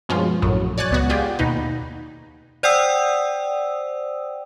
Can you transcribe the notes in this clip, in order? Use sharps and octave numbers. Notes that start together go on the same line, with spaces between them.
G2 B2 F3 G#3 C#4 F4
A#1 F#2 A2 F#3
C#5 D5 G#5 F#6 A6
C#2 B3 F#4
F4 G4 G#4 D5 G5
D#2 B2 D#4 B4
C5 D5 F#5 G5 D#6 E6